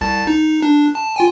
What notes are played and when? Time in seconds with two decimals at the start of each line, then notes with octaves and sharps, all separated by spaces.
0.01 C2 A5 A6
0.27 D#4
0.62 D4
0.95 A5
1.16 F4 G5 G#5